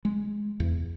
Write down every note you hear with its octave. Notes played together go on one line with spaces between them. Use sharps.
G#3
E2